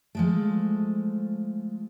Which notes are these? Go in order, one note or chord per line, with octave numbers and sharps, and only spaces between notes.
F3 G#3 A3